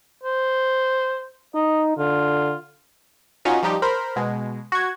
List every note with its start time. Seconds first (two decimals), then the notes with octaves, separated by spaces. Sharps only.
0.23 C5
1.55 D#4 D#5
1.98 D3 F4
3.45 C#4 D#4 F4 F#4
3.63 F3 G3 D#4 G4
3.82 A#4 C5 B5
4.16 B2 G#3
4.72 F#4 G#6